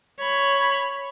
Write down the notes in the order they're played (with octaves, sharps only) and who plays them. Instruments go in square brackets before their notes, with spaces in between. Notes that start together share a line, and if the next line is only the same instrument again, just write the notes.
[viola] C#5 B5